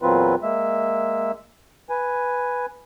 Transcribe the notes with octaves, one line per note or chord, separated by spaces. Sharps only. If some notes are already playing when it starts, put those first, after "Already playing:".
E2 A#2 F#3 C4 F4 B4
G#3 A#3 E5
B4 G#5